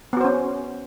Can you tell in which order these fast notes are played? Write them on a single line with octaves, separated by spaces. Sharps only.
B3 F#4 C5 C#4